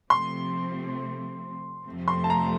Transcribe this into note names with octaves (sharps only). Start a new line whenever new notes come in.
C3 F3 A3 C4 C6
F2 C3 F3 A3 C4
C6
A5
A#5